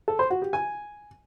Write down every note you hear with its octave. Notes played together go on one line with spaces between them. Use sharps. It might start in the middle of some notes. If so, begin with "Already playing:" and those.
A4
C5
F#4
G4
G#5